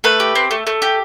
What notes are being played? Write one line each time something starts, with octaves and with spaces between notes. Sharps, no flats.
A3 B4
G4
C4
A3
A3
G4